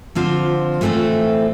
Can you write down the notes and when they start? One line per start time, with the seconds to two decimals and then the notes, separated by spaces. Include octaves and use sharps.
0.15 D3 F3 C4 F4
0.81 A2 E3 A3 C4 F4